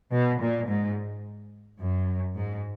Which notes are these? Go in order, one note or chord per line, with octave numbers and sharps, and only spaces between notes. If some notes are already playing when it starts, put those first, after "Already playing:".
B2
A#2
G#2
F#2
G#2